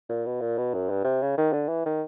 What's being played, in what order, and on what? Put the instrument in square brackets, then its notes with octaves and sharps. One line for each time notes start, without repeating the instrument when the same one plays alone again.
[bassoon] A#2
B2
A#2
B2
F#2
G2
C3
C#3
D#3
D3
E3
D#3